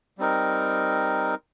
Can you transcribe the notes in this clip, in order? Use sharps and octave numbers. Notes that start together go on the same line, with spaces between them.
G3 C4 D#4 A#4